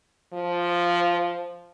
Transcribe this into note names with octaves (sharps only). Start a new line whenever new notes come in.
F3